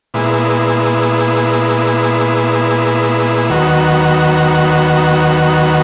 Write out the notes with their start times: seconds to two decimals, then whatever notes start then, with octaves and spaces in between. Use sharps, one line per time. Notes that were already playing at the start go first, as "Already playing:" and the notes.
0.14 A#2 G#3 B3 E4
3.50 D#2 D#3 F#3 B3 F#4